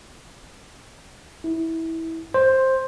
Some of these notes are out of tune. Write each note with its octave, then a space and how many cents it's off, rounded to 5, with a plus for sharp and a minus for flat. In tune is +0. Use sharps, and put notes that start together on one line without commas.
E4 -20
C5 +10